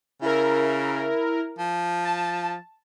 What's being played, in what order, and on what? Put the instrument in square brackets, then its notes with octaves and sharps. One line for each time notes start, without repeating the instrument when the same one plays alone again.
[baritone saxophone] C#3 [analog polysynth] E4 A#4
[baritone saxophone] F3
[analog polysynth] A5